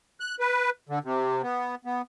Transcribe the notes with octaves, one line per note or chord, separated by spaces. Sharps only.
F#6
B4
D3
C3
B3
B3